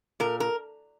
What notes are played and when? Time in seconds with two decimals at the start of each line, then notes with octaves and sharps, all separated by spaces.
0.20 A#2 A#4
0.40 A#4